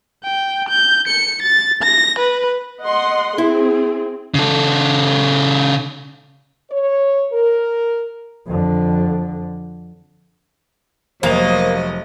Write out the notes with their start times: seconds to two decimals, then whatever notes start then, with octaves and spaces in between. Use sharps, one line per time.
0.24 G5
0.69 G6
1.08 C#7
1.42 A6
1.83 A#6
2.19 B4
2.81 D#5 F#5 C6
3.38 C4 E4 G#4
4.34 C#3 A4
6.70 C#5
7.33 A#4
8.46 F2 D3
11.23 F1 F#3 A#3 C5 D#5 F7